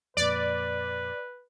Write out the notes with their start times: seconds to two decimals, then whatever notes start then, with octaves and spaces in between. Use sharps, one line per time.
0.17 F2 A#2 B4 D5